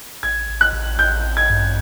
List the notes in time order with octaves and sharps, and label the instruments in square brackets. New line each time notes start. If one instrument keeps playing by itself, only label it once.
[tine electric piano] A1 [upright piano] G#6
[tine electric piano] A1
[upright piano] F#6
[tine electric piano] A1
[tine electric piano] A1 [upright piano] G6
[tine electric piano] A1
[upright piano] G#6
[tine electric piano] G2